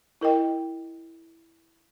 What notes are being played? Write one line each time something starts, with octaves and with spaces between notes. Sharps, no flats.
E4 A#4 D#5 G5